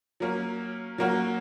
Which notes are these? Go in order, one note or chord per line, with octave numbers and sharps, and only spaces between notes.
F#3 A#3 C#4
F#3 A#3 C#4 F#4